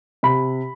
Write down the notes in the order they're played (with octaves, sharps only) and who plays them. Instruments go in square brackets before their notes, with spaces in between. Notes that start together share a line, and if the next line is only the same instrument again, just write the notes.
[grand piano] C3 B5